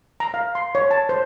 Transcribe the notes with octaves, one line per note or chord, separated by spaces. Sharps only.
A#5
F5
C6
C#5
A5
C5